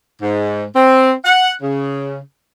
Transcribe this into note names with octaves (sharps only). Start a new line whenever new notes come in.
G#2
C4
F#5
C#3